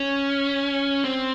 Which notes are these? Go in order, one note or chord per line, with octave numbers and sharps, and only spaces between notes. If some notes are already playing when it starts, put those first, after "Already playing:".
Already playing: C#4
C4